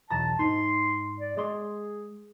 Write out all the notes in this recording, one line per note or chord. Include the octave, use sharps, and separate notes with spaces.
B1 E2 A5 A#5
G#2 D#4 C6
D5
G#3 G#4 D5 C6